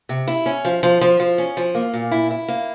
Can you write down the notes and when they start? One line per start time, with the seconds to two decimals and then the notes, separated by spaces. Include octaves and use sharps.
0.09 C3
0.28 E4
0.46 C#4
0.65 F3
0.83 F3
1.01 F3
1.20 F3
1.38 C#4
1.57 F3
1.75 A#3
1.94 A#2
2.11 E4
2.31 E4
2.48 A#3